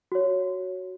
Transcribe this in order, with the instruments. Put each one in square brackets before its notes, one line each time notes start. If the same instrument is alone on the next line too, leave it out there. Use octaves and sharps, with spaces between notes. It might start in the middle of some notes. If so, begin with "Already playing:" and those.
[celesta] F#4 C#5